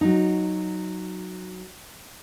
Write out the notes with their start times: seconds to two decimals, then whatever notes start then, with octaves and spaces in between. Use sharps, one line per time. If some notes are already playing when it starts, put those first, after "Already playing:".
0.01 F#3 D#4